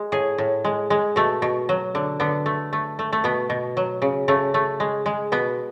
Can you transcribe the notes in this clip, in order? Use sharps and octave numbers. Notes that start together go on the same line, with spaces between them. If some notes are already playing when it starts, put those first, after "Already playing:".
Already playing: G#3
A2 G#4
A2
G#3
G#3
B2 A3
B2
F#3
D3
D3 B3
A3
A3
A3
A3
B2 B3
B2
F#3
C#3
C#3 A3
A3
G#3
G#3
B2 B3